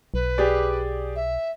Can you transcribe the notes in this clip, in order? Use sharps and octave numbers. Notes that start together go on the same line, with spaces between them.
B1 B4
G4 G#4 D5
E5